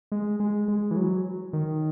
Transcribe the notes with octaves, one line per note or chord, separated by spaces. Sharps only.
G#3
G#3
G#3
E3
F#3
D#3